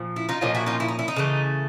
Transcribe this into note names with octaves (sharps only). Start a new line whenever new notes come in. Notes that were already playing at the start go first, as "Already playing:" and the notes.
Already playing: A#2 F3
E4
D#4 F4
A#2 F3 A#3 C#4 D#4 F4
E4 F#4
D#4 F4
E4
D#4
E4
D#4
C#3 E3 A3